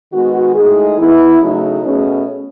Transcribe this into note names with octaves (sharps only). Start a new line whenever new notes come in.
D#3 G#3 B3 F#4
A2 G#3 D#4 G#4
E3 B3 E4
C#3 F#3 A3 D#4
B2 A3 C#4 G#4